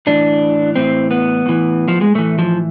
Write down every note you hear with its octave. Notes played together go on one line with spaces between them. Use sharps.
A2 E3 D4
A2 E3 C4
B3
A2 E3
F3
G#3
A2 E3 A3
F3